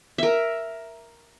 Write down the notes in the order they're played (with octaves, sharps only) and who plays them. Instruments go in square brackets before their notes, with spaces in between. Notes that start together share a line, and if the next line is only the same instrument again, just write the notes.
[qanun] A#4 E5